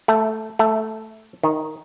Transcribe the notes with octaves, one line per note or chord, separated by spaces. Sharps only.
A3
A3
D#3